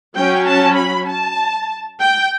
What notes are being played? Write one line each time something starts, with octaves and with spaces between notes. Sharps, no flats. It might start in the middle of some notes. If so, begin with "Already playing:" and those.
F#3 C#4 G5
A5
B5
A5
G5